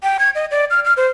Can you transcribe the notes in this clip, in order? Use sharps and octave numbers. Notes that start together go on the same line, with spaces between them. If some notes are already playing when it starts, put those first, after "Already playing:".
G5
G#6
D#5
D5
F6
F6
C5